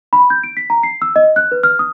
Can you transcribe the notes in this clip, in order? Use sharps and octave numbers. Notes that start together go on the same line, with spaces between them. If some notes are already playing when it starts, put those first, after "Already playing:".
B5
G6
D7
B6
A#5
C7
E6
D#5
F#6
B4
F6
D#6